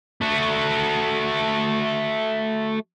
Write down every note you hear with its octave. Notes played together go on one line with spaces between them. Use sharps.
A3 F#4